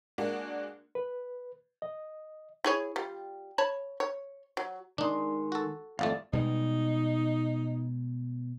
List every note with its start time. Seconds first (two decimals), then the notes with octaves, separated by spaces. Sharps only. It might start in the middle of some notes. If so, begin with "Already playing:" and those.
0.18 G#3 A#3 D4 F#4
0.95 B4
1.82 D#5
2.64 E4 G#4 C#5
2.96 G3 F4
3.58 C#5 A5 B5
4.00 C#5
4.57 F#3
4.98 D#3 G#3 D4 D#4 C6
5.52 F#4 A4
5.99 G#1 F2 A3 A4 D5 F5
6.33 B2 G3 G#3 D#4